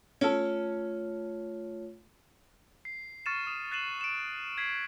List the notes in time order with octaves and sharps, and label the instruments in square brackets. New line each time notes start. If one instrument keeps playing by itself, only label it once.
[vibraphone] A3 F4 C#5 [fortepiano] C#4 A4
[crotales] C7
C#6 F6 A6 C#7 D#7 E7
D#6 E7
F#6 A6 C7 D#7 E7 F#7
D7 E7
G#6 B6 C7 F#7